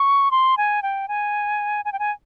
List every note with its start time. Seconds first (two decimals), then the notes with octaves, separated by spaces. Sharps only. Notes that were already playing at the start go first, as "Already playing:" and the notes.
Already playing: C#6
0.31 C6
0.57 G#5
0.83 G5
1.08 G#5
1.85 G#5
1.93 G5
1.99 G#5